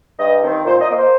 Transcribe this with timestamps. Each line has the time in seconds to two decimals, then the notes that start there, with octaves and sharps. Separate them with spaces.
0.19 G2 D#5
0.42 D#3 C4
0.65 A#2 C5
0.81 D#5
0.89 A#3
0.97 C5